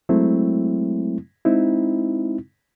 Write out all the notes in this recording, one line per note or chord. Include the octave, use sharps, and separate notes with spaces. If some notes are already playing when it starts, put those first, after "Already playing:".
F#3 G#3 A3 C4 E4
G#3 C4 D#4 E4